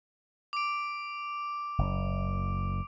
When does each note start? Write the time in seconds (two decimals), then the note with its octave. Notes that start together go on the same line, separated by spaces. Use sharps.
0.53 D6 D7
1.78 F#1